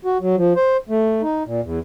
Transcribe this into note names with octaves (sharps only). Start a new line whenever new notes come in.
F#4
F#3
F3
C5
A3
D#4
A#2
E2